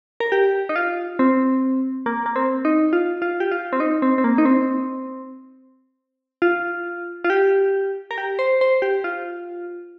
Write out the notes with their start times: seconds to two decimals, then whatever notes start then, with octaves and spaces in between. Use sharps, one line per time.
0.20 A#4
0.32 G4
0.69 D#4
0.76 F4
1.19 C4
2.06 A#3
2.26 A#3
2.36 C4
2.65 D#4
2.93 F4
3.22 F4
3.40 G4
3.51 F4
3.73 C4
3.80 D#4
4.02 C4
4.18 C4
4.24 A#3
4.38 D#4
4.45 C4
6.42 F4
7.24 F4
7.30 G4
8.11 A#4
8.18 G4
8.39 C5
8.61 C5
8.82 G4
9.04 F4